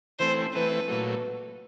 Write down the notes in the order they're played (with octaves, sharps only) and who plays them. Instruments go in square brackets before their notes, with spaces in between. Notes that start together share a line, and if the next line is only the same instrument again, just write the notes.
[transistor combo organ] E3 A3 C4 [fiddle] C5
[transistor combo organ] E3 A3 C4 [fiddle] B4
[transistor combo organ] A#2 F#3 A3